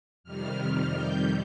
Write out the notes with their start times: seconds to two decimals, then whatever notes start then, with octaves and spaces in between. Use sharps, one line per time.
0.24 F2 C3 D#3 G3 F6
0.94 G6